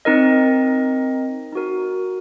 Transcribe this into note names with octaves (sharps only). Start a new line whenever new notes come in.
C4 D#4 A#4 D#5
D#4 F#4 A#4